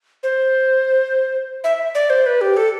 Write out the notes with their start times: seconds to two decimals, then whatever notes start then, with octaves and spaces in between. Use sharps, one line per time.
0.23 C5
1.64 E5
1.95 D5
2.10 C5
2.26 B4
2.41 G4
2.57 A4